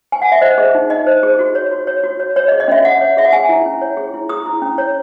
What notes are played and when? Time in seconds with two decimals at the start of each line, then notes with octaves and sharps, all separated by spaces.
0.12 G#5
0.22 F#5
0.32 E5
0.41 C5 D#5
0.58 G#4
0.75 D#4
0.90 D#4 D#5
1.06 C5
1.23 G#4
1.39 F#4
1.55 C#5
1.71 F#4
1.87 C#5
2.03 F#4
2.20 C#5
2.36 C#5
2.48 D#5
2.52 G#4
2.60 D#5
2.68 C#4 E5
2.84 C#4 F#5
3.01 C#5
3.17 G#4 E5
3.25 F#5
3.33 G#4 G#5
3.49 E4
3.66 C#4
3.81 C#5
3.97 G#4
4.14 E4
4.29 G#4 D#6
4.46 E4
4.62 C#4
4.78 C#5